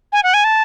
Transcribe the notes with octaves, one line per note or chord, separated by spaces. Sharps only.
G#5
F#5
G#5
A5